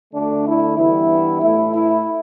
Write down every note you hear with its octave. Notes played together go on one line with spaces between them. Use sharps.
D2 D3 A3 D4
E4
G2 E3 B3 E4
A2 A3 E4
E4